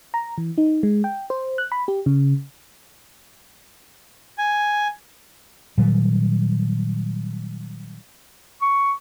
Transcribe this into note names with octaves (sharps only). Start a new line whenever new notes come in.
A#5
E3
D#4
G#3
G5
C5
F#6
B5
G4
C#3
G#5
A#2 D#3 F#3 G3
C#6